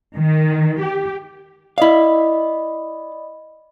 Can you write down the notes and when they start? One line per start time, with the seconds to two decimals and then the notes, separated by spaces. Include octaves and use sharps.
0.17 D#3
0.81 G4
1.78 E4 D5 D#5 F5 B5